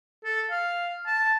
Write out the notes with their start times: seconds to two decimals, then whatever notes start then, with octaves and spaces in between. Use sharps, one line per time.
0.24 A4
0.51 F5
1.06 A5